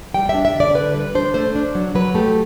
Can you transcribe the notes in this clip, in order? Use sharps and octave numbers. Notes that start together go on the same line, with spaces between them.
G3 G5
E5
D4
E5
D3
D5
D3 B4
G3 B4
D4 C5
A3 C5
D4
F#3
F#3 B4
A3 G4